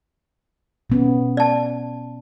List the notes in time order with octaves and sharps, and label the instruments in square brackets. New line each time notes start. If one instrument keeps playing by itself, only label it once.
[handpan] B2 B3 C#4
[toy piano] D5 A5